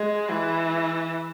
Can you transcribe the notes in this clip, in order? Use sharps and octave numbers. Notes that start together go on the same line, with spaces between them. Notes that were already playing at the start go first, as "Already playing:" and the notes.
Already playing: G#3
E3